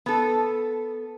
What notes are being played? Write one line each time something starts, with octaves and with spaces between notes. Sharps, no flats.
B3 A4